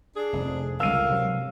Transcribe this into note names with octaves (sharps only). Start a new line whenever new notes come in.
D4 G#4
F1 C3
C#2 G2 A4 A#4 F5 E6 D#7
C3 F#3